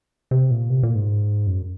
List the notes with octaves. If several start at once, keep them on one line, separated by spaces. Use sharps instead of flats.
C3
A#2
C3
A#2
G#2
F#2